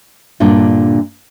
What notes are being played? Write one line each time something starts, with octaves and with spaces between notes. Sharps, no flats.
G2 A#2 D3 D4